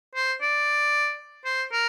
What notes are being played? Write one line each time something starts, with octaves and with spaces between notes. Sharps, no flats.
C5
D5
C5
A#4